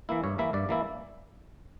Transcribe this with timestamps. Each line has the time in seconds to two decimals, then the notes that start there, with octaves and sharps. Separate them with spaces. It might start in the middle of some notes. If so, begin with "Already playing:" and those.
0.09 E3 A#3 E4
0.24 G2 C#5
0.38 E3 A#3 E4 E5
0.53 G2 D5
0.69 E3 A#3 E4